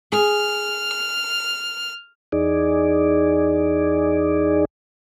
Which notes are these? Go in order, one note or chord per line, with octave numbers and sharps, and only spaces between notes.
G#4 F6
E2 D#4 G#4 D5